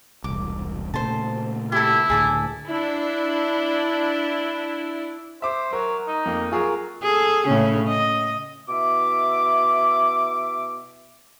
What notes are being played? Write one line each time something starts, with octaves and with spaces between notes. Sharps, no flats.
E1 C2 D6
A#2 C#3 A3 C5 A5
E4 G4 A4
C#2 A2 D3 G#4 A5 D6
D4 E4
C5 E5 D6
F#3 A#4
D#4
F2 A#3
F#3 F4 G#4 A#4
G#4 A4
A2 C#3 C#4
D#5
B2 E4 E5 D6